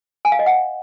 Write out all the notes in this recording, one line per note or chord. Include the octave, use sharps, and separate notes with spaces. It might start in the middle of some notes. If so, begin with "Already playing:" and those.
G#5
F5
D#5
F#5